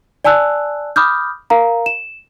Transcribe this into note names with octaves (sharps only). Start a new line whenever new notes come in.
D5 G#5 A5 E6 F#6
B5 D6 D#6 F6 G6
A#4 F5 A#5
E7